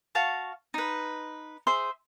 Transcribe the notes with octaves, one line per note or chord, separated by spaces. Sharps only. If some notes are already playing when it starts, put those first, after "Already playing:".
F#4 F5 A5 C#6
D#4 B4
G#4 C5 E5 C6